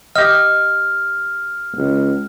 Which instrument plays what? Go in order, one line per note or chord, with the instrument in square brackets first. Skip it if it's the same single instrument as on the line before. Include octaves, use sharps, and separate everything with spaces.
[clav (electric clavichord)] G4 D#5 [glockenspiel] F6
[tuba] C#2